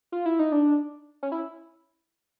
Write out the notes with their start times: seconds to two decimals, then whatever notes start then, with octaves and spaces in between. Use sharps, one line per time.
0.12 F4
0.26 E4
0.39 D#4
0.52 D4
1.23 C#4
1.32 E4